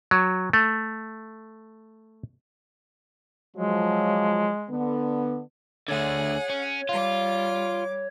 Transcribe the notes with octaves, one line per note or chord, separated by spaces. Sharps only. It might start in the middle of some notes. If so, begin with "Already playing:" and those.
F#3
A3
F3 F#3 G#3
D3 B3
D2 D3 G#4 C#5 F#5
C#4
G3 F4 D6